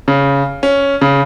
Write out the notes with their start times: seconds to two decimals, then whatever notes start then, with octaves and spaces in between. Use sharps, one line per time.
0.08 C#3
0.63 C#4
1.01 C#3